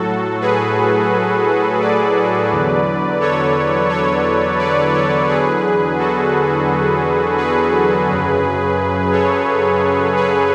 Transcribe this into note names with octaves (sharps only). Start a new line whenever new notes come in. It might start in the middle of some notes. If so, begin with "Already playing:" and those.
Already playing: A2 F#3 F#4 A4
G#4 B4
B4 D5
E2 D3 F#3
A4 C#5
A4 C#5
B4 D5
A4 C#5
E2 D3 F#3 G#4 B4
F#4 A4
G#4 B4
F#2 C#3 F#3
A4 C#5
G#4 B4